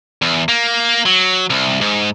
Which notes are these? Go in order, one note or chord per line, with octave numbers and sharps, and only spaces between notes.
E2
A#3
F#3
C2
G#2